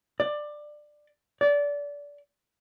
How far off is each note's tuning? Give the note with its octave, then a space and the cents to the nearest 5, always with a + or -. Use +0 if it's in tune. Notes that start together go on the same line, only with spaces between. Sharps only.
D5 +15
D5 -25